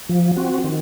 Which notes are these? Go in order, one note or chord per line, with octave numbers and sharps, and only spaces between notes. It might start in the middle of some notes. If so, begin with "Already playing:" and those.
F3
C4 F#4
D#3